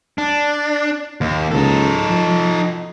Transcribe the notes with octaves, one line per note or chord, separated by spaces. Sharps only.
D4
D#2
C#2 D#4 A4
F3